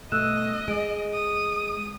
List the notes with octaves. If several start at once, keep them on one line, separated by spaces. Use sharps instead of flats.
G2 B2 A3 D#5 E6 F#6 E7
G#3 D7
D#6